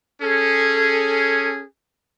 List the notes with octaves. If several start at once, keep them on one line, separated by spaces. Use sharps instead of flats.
C#4 G#4 A4